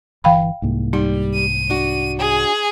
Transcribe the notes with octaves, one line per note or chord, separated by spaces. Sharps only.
G1 E3 F5 G5 B5
C2 G#2 A#3
G3 D#4
D#7
D4 F#4
G#4